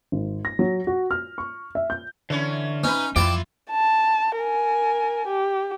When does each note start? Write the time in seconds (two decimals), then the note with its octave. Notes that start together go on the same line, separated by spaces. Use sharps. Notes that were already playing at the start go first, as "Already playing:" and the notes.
0.12 G#1
0.45 A#6
0.59 F#3
0.87 F#4
1.11 F6
1.38 C#6
1.75 E5
1.90 G6
2.30 D3 E3 C#4
2.84 C#4 D#4 B4
3.16 F2 E3 E4 F4 D5 G5 A5
3.71 A5
4.37 A#4 G#5
5.27 G4